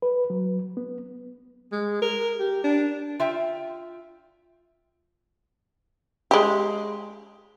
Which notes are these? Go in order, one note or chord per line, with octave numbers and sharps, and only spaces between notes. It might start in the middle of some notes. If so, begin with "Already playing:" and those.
B4
F#3
B3
G#3
A#4
G4
D4
F4 E5 G5
G#3 G4